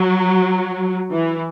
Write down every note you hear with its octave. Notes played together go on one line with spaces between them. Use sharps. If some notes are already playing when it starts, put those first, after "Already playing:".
Already playing: F#3
E3